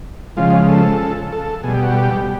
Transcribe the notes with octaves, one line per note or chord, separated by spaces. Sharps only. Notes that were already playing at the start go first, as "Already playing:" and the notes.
C#3 F3 G#3 F4
A4
A4
B2 G3 G#4
G4
F#4
G4